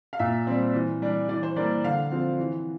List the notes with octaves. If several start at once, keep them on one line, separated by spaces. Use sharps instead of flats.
F5
A#2 E5
G3 C4
E3
G3 D4
E3 D5
C5
G3 A#3 D4 D5
D3 F5
F3 C4
E3